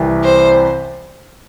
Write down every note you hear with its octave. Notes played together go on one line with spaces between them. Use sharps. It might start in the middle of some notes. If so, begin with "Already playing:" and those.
Already playing: C2 C3 E3
C5